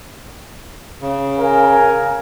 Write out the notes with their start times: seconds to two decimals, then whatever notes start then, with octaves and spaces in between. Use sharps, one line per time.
1.02 C#3
1.38 A#4 F5 G#5